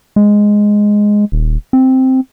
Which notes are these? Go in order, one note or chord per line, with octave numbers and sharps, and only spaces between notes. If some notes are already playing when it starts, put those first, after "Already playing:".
G#3
D#1
C4